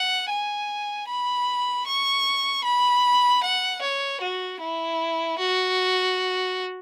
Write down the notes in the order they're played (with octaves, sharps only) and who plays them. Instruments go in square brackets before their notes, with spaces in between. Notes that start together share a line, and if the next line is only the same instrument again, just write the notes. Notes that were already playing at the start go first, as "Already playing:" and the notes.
Already playing: [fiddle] F#5
G#5
B5
C#6
B5
F#5
C#5
F#4
E4
F#4